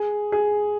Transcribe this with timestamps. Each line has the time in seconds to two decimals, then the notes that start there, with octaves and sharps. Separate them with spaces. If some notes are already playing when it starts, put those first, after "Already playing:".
Already playing: G#4
0.32 G#4